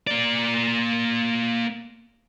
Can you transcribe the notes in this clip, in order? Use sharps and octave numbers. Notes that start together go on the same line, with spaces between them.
A#3 D5